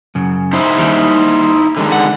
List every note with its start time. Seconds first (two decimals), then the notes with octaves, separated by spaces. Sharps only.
0.15 F#2 C#3
0.53 D#4 E4 C5
0.78 D#2 D#3 G3
1.77 D3 D#3 G#3
1.92 F#5